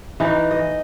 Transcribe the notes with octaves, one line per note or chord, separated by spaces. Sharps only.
E3 D#4
D#5